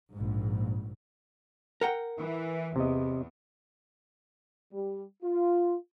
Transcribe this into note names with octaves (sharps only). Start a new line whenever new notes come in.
A#1 G#2
A#4 F#5 G5
E3
E2 C3 D#5
G3
F4